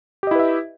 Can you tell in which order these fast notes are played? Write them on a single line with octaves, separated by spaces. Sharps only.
G4 D#5 E4 B4 E5